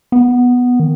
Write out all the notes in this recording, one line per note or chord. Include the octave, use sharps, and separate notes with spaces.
B3
D#3